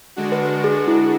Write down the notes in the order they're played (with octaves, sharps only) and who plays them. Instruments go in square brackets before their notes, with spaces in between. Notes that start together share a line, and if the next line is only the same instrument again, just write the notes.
[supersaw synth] D3 G#3 D4 F#4
[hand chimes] B4
G#4
E4